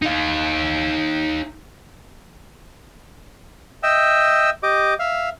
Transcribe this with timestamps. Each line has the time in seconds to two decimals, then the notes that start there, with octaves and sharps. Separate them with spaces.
0.02 D#4 F5
3.83 D#5 E5 G5 E6
4.63 G4 D#5 D6
4.99 E5 F5